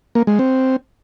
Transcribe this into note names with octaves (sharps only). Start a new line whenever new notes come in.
A#3
G#3
C4